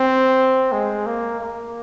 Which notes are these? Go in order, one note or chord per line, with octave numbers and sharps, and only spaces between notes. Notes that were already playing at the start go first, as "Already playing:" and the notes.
Already playing: C4
G#3
A#3
A#3